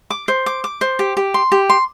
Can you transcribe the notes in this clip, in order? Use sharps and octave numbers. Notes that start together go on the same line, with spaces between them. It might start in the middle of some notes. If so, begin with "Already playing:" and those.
D6
C5
D6
D6
C5
G4
G4
C6
G4
C6